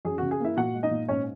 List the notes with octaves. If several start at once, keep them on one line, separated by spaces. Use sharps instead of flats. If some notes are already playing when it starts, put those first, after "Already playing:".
F#2 G#4
F#4
C#3
G#4
A#3 E4 E5
A#2 F#4 F#5
G#3
D#4 D#5
A#2
G#2 C#4 C#5